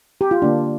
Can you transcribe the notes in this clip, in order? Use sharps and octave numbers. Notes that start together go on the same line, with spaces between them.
G4
F4
D3 A#3 D4